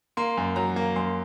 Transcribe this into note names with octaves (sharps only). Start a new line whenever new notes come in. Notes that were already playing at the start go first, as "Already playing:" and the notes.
A#3 C6
F#2
F#3 A#5
A#3
F#2 C6